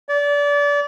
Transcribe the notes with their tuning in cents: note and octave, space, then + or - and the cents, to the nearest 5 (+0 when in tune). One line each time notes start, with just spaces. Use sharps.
D5 -30